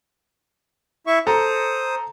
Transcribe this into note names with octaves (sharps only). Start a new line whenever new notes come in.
E4 E5 C#6
A4 C5 A#5 D#6